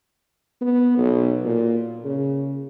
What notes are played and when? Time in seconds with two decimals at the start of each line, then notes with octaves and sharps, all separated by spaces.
0.61 B3
0.97 B1
1.45 A#2
2.04 C#3